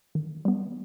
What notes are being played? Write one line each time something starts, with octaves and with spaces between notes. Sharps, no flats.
D#3
G3 B3